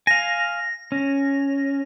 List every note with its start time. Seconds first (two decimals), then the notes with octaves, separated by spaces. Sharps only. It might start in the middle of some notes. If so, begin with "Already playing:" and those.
0.07 F5 G#5 A#6
0.92 C#4